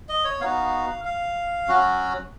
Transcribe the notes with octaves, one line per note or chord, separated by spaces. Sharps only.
D#5
C#5
B3 D#4 F#4 F5
F5
F#3 C#4 F#4